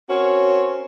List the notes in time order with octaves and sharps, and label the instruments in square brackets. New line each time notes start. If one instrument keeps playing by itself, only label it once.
[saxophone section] C4 C#4 F#4 A#4 C#5